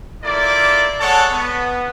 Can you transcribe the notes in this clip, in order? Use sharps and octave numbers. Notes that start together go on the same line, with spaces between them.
A#3 E4 F4 A4 D5
G#3 A4 C#5 F#5 A5 C#6
B3